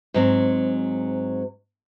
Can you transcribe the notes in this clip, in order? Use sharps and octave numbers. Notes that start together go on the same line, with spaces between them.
G#2 F#3 C4